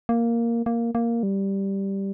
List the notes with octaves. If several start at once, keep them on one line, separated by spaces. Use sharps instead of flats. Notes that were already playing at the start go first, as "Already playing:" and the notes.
A#3
A#3
A#3
G3